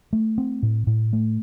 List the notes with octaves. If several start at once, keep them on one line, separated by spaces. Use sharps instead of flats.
A3
C4
A2
A2
A3